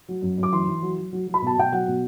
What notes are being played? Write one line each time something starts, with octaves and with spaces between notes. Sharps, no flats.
F#3
F#2
F#2
D6
E3 C6
E3
F#3
F#3
F#3
F#3
B5
B2 A5
B2 G5
F#3 F#5
B2